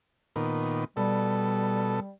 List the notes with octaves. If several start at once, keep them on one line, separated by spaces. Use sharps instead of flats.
A#2 D#3 B3
B2 G3 A4